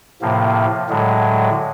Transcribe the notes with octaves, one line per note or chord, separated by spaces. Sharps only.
A2 C3 F3 A#3
A2 D3 F#3 G#3